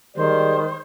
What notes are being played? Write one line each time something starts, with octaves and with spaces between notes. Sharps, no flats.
D#3 G3 G#3 C5 D5